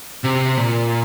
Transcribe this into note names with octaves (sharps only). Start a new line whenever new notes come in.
C3
A#2